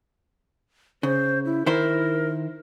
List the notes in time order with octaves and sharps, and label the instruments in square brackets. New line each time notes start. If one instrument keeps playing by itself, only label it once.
[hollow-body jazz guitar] C#3 [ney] C5
[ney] E4
[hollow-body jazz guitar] D#3 E4 C5 [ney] A#4